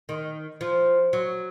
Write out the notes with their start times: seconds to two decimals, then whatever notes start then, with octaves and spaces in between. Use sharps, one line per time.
0.09 D#3
0.61 F3
1.13 F#3